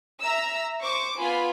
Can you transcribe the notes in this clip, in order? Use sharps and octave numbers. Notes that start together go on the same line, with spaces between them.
E5 A#5 E6
C5 C#6 D6
B3 F4 G#5 B5